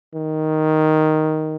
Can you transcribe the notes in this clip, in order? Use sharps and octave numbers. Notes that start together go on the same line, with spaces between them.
D#3